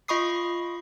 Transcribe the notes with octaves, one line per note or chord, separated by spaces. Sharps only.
F4 D#5 B5 C#6 D#6 C7